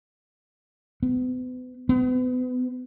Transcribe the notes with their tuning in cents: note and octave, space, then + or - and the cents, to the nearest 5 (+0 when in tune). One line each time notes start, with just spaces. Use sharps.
B3 +40
B3 +35